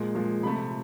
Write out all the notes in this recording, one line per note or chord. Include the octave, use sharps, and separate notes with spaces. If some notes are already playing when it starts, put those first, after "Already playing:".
Already playing: A#2 F3 G#3
A#2 F3 G#3
C3 F3 A3 B5